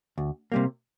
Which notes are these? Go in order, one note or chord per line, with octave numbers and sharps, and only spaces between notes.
D2
C3 G3 A#3